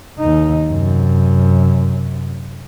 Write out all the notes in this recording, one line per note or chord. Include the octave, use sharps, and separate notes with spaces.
D#2 D#4
F#2 C3